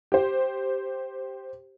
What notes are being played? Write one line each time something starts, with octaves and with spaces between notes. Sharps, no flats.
G4 C5